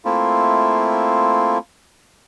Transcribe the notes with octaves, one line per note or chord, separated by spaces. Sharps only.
A3 A#3 C4 E4 F4